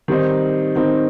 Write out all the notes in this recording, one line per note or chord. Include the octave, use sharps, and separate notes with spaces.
D#3 G3 C4 D#4
D#3 G3 C4 D#4